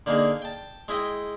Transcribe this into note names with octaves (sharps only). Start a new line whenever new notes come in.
D3 A#3 D#4 G#4 A#4
G5 A5
G#3 E4 D#5 G5